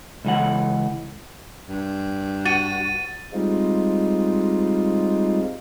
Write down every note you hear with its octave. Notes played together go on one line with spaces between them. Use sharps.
C#2 E3 F#5
G2
F#4 A6 D#7
G3 G#3 C4 D#4 F4